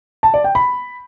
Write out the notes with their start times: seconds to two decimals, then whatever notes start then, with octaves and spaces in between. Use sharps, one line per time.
0.23 A5
0.34 D5
0.44 G5
0.55 B5